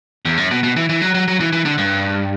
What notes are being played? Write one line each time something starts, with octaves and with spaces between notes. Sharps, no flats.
E2
F#2
B2
B2
E3
E3
F#3
F#3
F#3
E3
E3
D3
G2